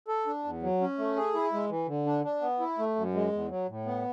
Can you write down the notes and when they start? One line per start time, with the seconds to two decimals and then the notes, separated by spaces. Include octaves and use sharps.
0.08 A4
0.27 D4
0.45 E2
0.62 F#3
0.81 C#4
0.98 A3
1.16 G#4
1.35 E4
1.53 G#3
1.70 E3
1.88 D3
2.06 D4
2.24 D4
2.42 B3
2.60 E4
2.78 A3
2.96 F#2
3.14 G#3
3.32 E2
3.50 F#3
3.69 A2
3.86 B3